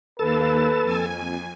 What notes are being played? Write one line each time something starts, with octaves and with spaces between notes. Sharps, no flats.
D#2 A#3 A4 B4 A5
F2 G#5